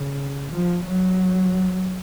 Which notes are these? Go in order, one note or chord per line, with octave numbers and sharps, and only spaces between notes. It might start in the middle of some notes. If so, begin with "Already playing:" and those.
Already playing: C#3
F3
F#3